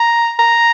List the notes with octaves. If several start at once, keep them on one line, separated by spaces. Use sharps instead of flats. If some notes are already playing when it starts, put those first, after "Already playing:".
Already playing: A#5
A#5